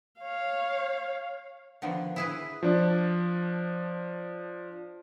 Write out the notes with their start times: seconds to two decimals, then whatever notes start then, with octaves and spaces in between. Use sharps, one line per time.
0.21 C#5 F5
1.82 D3 D#3 F3 B3
2.16 E4 G#4 B4
2.63 F3 D4